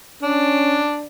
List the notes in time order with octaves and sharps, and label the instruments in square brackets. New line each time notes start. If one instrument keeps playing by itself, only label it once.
[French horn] C#4 [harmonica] D4